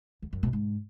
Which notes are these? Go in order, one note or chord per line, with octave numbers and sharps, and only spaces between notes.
E2
F#2
B2
G#2